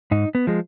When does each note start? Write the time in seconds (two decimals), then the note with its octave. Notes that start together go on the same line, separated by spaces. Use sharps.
0.11 G#2 D#4
0.35 B3
0.47 F3 G#3